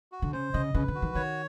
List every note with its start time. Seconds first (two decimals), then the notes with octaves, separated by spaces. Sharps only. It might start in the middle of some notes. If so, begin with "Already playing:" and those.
0.12 F#4
0.22 D3
0.33 C#3 C5
0.54 C#3 D#5
0.74 C#3 B4
0.88 D3
0.95 F#4
1.02 D#3
1.15 D#3 C#5